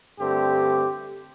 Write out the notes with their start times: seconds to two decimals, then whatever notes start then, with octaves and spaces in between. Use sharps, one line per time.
0.19 G2 D3 A3 C4 G4